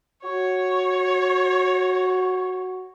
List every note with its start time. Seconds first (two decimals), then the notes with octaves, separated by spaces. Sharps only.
0.24 F#4 C#5